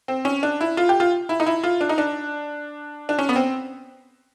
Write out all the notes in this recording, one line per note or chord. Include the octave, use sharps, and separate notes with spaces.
C4
C#4
D4
E4
F4
G4
F4
E4
D#4
E4
F4
D4
D#4
D4
D4
C#4
B3
C4